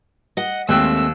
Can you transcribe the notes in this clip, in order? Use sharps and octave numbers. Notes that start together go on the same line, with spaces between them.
D#5 F#5
D#2 G#3 A3 C4 E6 F#6